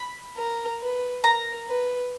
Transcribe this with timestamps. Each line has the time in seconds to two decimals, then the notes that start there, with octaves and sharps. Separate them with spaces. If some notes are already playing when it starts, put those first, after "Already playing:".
Already playing: B5
0.37 A#4
0.81 B4
1.24 A#4 A#5
1.68 B4